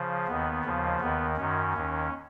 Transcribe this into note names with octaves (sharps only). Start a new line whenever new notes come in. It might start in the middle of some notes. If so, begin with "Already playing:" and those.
Already playing: C#3 F3
D#2 D#3 B3
D#2 C#3 F3
D#2 D#3 B3
F#2 D#3 C#4
D#2 D#3